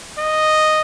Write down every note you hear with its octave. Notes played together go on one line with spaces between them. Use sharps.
D#5